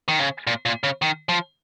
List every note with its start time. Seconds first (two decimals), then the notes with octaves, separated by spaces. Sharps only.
0.08 D#3
0.19 C#3
0.47 A#2
0.65 A#2
0.83 C#3
1.02 D#3
1.29 F3